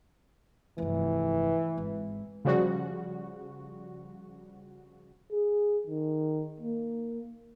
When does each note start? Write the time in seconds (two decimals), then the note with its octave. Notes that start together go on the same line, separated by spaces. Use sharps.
0.78 F1 G2 E3
1.77 G#1
2.45 C#3 F3 G3 F#4
5.32 G#4
5.87 D#3
6.60 A#3